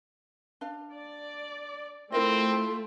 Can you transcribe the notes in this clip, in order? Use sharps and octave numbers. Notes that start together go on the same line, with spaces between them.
D4 F5
D5
A3 C4 E4 F4 A#4 D#5